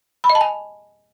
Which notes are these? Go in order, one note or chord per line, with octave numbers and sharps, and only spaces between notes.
B5
D#5
A5
G#5